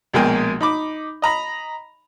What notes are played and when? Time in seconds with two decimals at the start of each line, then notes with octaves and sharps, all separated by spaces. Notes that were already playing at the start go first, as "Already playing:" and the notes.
0.14 A#1 B2 G#3 A#3 G5 G#5
0.61 D#4 B5 D6
1.22 D#5 A#5 B5